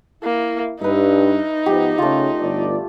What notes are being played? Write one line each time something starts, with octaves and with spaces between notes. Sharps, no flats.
A#3 E4
G2 D#4 B4 E5
G#2 F3 B3 G4
C#3 A3 F4
G1 D5